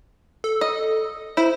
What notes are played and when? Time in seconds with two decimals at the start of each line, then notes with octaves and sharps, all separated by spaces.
0.44 A4
0.61 D#5
1.37 E4 C5